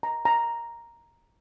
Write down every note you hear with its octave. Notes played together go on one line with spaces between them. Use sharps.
A#5
A#5